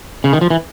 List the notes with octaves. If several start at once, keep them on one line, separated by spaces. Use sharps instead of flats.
C#3
D#3
F3
E3